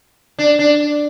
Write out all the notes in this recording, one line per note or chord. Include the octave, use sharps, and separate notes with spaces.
D4
D4